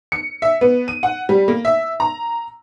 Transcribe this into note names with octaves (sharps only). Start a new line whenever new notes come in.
C#7
E5
B3
D#7
F#5
G3
A#3
E5
A#5